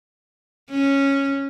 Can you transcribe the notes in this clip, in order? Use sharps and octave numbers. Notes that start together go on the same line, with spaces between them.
C#4